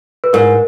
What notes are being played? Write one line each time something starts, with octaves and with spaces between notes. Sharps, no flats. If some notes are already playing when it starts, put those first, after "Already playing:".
B4
G#2 A#4